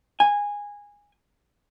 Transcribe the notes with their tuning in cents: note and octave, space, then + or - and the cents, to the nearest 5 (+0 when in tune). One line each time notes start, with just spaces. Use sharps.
G#5 -15